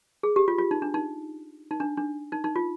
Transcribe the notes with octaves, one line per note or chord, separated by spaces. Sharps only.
G#4
G4
F4
F4
D#4
D4
D#4
D#4
D4
D4
D#4
D#4
F4